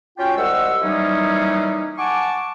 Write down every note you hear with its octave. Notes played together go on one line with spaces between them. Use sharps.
C#4 F4 F#4 G5
C2 G#3 F#5 E6
E3 F#3 G3 A#3 C#4 D#4
F#5 G#5 A5 C#6 D6